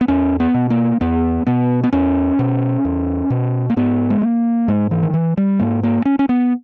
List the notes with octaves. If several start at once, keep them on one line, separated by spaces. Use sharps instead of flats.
B3
E2 C#4
B3
B2
A#3
E2 B3
B2 B3
B3
E2 C#4
B2
E2
B2
A#3
G#2 B3
G#3
A#3
G#2 G#3
E3
D#3
E3
G3
G#2 A#3
A#3
C#4
C#4
B3